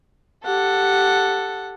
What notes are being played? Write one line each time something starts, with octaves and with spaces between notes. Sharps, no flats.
G4 A4 F#5